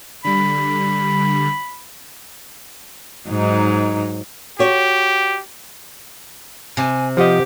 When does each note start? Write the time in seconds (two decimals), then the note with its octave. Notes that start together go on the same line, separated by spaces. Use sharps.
0.25 D3 G3 B5
3.29 G#2 F#3 D#4
4.59 F#4 G4 C#5
6.77 C3 G#5
7.17 F3 G4 D#5 F#5